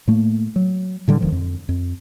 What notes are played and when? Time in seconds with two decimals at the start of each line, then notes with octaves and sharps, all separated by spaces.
0.08 A2 A3 A#3
0.56 F#3
1.08 A2 D3 G3
1.21 E1 D#3 F3
1.32 F2
1.69 F2